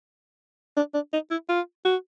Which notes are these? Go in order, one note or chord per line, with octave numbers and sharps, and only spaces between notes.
D4
D4
D#4
E4
F4
F#4